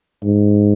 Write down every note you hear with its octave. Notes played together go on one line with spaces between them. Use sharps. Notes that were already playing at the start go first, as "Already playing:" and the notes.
G#2